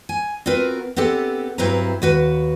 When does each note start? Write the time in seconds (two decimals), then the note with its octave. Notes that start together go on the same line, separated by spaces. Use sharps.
0.09 G#5
0.46 C4 F4 F#4 A#4 B4
0.96 B3 C4 D4 G4 A4
1.58 G2 F#3 C4 E4 B4 A#5
2.02 D#2 F#4 B4